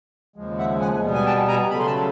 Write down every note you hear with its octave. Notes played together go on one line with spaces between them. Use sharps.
D#2 C#3 F3 G#3
E5 F#5
F#5 G#5
B2 G3 B3
G#5
G5 A5
G#5 A#5
C#3 F#3 A3 B5
C6
A5 B5